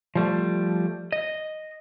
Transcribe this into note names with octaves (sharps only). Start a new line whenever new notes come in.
F3 G3 A3
D#5